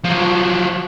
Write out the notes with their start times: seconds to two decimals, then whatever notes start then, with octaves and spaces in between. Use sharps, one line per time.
0.05 F3 F#3